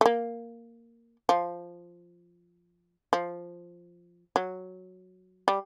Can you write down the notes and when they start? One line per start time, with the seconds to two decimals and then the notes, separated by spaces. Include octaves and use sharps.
0.01 A3
0.06 A#3
1.29 F3
3.13 F3
4.36 F#3
5.48 G3